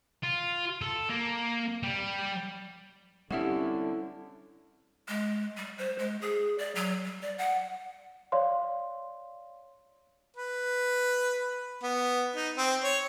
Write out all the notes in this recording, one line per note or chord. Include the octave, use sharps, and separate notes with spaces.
F4
A4
A#3
G3
D3 G3 C4 C#4 E4 G4 E5 F#5
G#3
G3
C5
G#3
G#4
D5
F#3
G3
D5
F#5
C#5 D5 F5 C6
B4
B3
D#4
C4
C#5